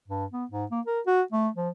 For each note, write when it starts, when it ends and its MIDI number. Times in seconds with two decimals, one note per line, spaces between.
0.08 0.26 43
0.32 0.45 59
0.51 0.65 44
0.71 0.80 58
0.87 1.00 70
1.06 1.22 66
1.32 1.49 57
1.56 1.69 53